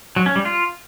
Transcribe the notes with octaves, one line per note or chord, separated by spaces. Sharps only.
F#3
C#4
G3
F4